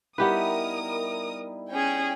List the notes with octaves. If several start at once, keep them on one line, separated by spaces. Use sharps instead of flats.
G3 B3 D#4 E4 G4 A#4 B4 D#6
C#4 G#4 G5 G#5